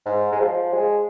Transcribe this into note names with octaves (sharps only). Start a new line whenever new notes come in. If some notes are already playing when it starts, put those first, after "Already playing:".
G#2
G#3
F3
G#3